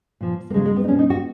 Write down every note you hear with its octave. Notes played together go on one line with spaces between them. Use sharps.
A#2 F3
A#3
C#3 F#3 G#3
G#3
B3
D#4
B2 F#3 C#4
D#4
F#4